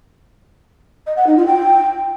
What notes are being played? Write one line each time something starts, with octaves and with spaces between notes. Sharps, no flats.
D#5
F#5
D#4
F4
G5